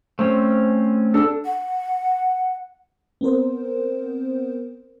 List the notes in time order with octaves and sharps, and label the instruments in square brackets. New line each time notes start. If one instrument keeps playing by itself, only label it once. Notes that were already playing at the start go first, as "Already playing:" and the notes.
[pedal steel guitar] A3 C4 C#4 [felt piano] C5
[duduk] D4 [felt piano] A4 E6
[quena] F#5
[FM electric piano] B3 C4 A#4 C5